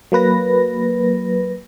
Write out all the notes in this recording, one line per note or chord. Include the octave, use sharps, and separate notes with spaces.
F#3 A#3 B4 A#6